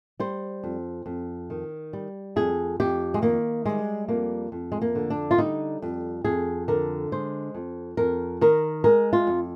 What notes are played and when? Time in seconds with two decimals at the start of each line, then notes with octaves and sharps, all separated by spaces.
0.20 G3 C5
0.63 F2
1.06 F2
1.50 D#3
1.93 G3
2.36 F2 G#4
2.80 F2 G4
3.14 G#3
3.22 D#3 A#3
3.65 G3 G#3
4.08 F2 A#3
4.52 F2
4.72 G#3
4.82 A#3
4.95 D3
5.10 D4
5.31 F4
5.38 G3 D#4
5.82 F2
6.24 F2 G#4
6.68 D3 A#4
7.12 G#3 C5
7.54 F2
7.97 F2 A#4
8.41 D#3 A#4
8.84 G#3 A#4
9.13 F4
9.27 F2